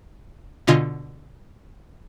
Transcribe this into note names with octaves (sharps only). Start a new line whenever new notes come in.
B2 D3 F4 D#5 G#5